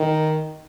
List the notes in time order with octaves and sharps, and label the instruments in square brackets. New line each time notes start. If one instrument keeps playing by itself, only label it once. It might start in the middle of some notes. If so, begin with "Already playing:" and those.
Already playing: [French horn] D#3